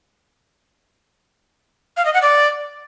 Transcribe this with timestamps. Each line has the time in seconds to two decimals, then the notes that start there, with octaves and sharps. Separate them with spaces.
1.97 F5
2.05 D#5
2.14 F#5
2.22 D5